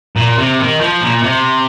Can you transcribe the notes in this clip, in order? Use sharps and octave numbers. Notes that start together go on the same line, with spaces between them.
A#2
C3
D#3
F3
A#2
C3